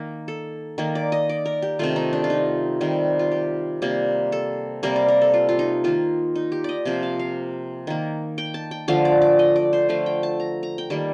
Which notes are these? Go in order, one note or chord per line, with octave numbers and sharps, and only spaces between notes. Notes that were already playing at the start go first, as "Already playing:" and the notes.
Already playing: D#3 A#3
A4
D#3 A#3
D5
D#5
D5
A#4
G4
C3 D#3 A3 F4
D#4
D4
F4
D#4
C3 D#3 G3
F4
G4
C3 G3 A#3
A4
C3 G3 A#3 A#4
D5
A#4
A4
F4
F4
D#4
D#3 A#3 F4
D#4
G4
D5 D#5
C3 F3 A#3
F5
F5
D#3 A#3
G5
A5
G5
D3 F3 A3 F5
D5
D5
D#5
D5
C5
D3 F3 A3 F5
G5
A5
A#5
A#5
G5
D#3 G3 A#3 A5